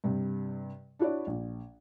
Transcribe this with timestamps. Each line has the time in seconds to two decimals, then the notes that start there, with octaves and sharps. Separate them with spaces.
0.04 G2 C3
0.99 D4 E4 F#4 C#5 D5
1.27 A#1